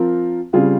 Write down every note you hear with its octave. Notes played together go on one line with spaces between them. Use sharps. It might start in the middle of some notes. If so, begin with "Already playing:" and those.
Already playing: F3 C4 F4 A#4
C#3 G3 C4 F4 G#4